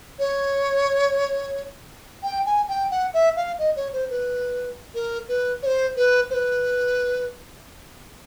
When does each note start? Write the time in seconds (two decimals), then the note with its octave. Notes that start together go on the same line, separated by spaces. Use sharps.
0.19 C#5
2.23 G5
2.46 G#5
2.68 G5
2.91 F#5
3.14 E5
3.37 F5
3.59 D#5
3.76 C#5
3.93 C5
4.10 B4
4.95 A#4
5.29 B4
5.63 C#5
5.66 C5
5.97 B4
6.30 C5
6.34 B4